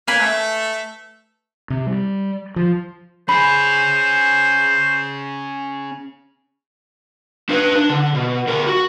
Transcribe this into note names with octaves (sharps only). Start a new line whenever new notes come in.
A#3 B4 G#5 B5
A3
C3
G3
F3
C#4 G#4 C5 B5
D4 B4
D4
D3
B2
D2 A#4
F#4